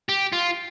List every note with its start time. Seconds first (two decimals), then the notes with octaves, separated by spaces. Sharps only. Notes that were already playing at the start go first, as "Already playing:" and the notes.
0.09 G4
0.33 F4